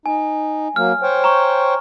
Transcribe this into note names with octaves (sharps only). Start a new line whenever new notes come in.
D#4 G#5
F#3 A#3 F6
C5 C#5 G5
A#5 C#6